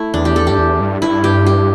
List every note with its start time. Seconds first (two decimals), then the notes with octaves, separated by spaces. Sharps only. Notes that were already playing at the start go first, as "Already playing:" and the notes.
Already playing: A3 E4
0.14 E2 D4
0.25 G4
0.36 A4
0.47 G2 G4
0.58 E2
0.80 G2
1.02 G2 E4
1.24 G4
1.46 G4